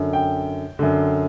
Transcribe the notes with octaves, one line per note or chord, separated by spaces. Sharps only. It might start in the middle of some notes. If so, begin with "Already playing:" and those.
Already playing: F#2 D3
G5
F#2 D3